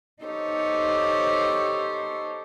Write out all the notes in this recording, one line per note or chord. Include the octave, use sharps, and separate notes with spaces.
D#4 G4 A4 C5 C#5